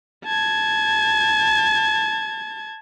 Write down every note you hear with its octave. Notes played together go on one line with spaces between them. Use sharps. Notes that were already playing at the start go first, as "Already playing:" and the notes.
A5 G#6